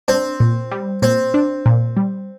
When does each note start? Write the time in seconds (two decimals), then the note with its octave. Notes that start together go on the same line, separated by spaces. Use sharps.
0.08 C4 D4
0.40 A#2
0.71 G3
1.02 A#2 C4
1.34 D4
1.66 A#2
1.97 G3